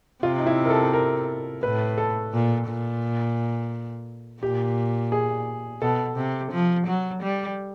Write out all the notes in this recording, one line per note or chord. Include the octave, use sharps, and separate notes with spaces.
C3 F4
D#4
E4
A#4
A4
A#4
A2 B4
A4
A#2
A#2
A#2 G4
G#4
B2 A4
C3
F3
F#3
G3